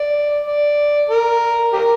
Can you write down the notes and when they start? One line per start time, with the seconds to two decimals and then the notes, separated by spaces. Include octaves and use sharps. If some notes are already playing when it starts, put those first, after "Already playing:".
Already playing: D5
0.44 D5
1.09 A#4
1.73 G4 A#4